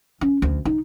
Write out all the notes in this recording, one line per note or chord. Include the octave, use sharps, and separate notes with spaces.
C#4
D2
D#4